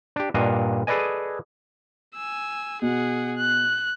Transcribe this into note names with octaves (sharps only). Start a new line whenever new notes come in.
D4 G4
G2 A#2 D4 D#5 F5 F#5
G#4 A4 B4 D5 D#5 G#5
G#5 E6
B2 G#4 F#5
F#6